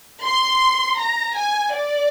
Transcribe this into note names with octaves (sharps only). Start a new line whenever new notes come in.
C6
A#5
G#5
D5